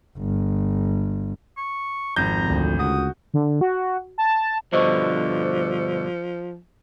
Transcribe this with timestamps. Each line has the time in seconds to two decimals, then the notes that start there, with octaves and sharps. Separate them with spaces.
0.18 G1
1.57 C#6
2.16 G#1 F2 A#5 G6
2.47 D2
2.79 C#2 F#4 D#6
3.34 D3
3.61 F#4
4.18 A5
4.73 G2 B2 D3 F3 C5 D#5 C#6